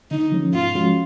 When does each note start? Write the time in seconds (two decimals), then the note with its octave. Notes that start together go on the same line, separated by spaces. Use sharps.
0.11 D3 D#4
0.32 F3 A3 C#4
0.54 G#2 F4
0.75 F3 G#3 C#4 F#4